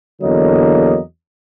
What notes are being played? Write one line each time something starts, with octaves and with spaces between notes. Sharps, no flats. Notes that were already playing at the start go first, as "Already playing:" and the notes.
E2 D3 F#3 A#3 D#5